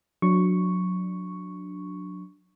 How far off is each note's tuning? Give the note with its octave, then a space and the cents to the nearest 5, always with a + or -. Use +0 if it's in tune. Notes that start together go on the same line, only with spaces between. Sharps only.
F#3 -20 D4 +0 C#6 +0